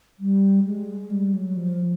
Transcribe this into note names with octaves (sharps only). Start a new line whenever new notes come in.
G3
G#3
G3
F#3
F3